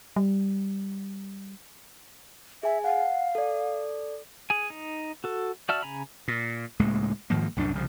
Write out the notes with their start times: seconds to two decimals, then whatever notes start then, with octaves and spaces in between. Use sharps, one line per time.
0.16 G3
2.63 G#4 E5 G#5
2.84 F5 F#5
3.35 A4 D5
4.50 G#4 G#5
4.70 D#4
5.24 F#4 A4
5.69 F#4 D5 E5 A5 F6
5.82 C#3 G#5 A#5 B5
6.28 A#2
6.80 C#2 A2 G#3 A#3
7.30 G#2 D#3 F3 A#3
7.56 C2 F#2 A2 D4
7.73 C2 C#3 F3